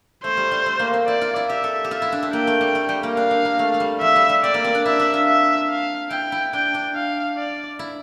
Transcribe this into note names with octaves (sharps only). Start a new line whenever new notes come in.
A3 C5
G3
G3
A3
A#3
C4
E4 D5
F4
E4
G4 E5
A4
G4
F4 E5
E4
D4
C4
A#3 G5
A3
G3
A3
G3
A#3
D4 F5
C4
A#3
A3
A3
G3
F3 E5
G3
G3
C4 D5
A#3
C4
D4
E4 E5
D4
F4
E5
F5
E4 G5
E4
D4 G5
D4
F5
D5
E4